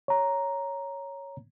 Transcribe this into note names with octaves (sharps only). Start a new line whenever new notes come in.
C#5 A#5